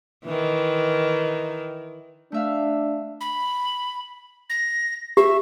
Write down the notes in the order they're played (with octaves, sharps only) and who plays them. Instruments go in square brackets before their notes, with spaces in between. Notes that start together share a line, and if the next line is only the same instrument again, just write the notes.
[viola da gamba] D#3 E3
[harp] A3 E5 F5 [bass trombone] D4
[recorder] B5
A#6
[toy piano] G4 [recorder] E5